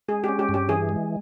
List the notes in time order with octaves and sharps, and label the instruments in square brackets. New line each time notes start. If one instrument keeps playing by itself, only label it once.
[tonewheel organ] G#3 [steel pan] G#4
[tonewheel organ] C#4 [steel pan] G4
[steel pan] G4
[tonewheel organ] G2
[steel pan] G4
[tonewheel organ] E3 [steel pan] G#4
[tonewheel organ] G#3